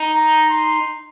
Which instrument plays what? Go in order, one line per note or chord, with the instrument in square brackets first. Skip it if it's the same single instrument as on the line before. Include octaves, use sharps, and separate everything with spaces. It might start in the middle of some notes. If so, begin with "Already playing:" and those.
Already playing: [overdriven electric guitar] D#4
[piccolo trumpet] A#5
C6